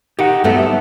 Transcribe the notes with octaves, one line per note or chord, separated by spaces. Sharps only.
D#3 G4 F#5
G2 F#3 A3 B3 A4 E5